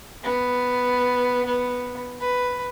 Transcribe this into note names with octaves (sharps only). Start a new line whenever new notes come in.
B3
B3
B4